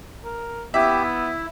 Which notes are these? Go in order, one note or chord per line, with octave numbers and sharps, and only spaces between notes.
A#4
B3 E4 G4 E5
E4